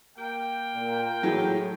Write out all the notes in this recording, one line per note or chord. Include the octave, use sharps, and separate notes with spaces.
A#3 G5
A#2
A2 E3 F#3 A3 G#4